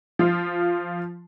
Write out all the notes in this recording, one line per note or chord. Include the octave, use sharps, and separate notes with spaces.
F3 F4